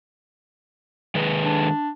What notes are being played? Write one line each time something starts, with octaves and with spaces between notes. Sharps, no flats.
D#3 G#3 B4
D4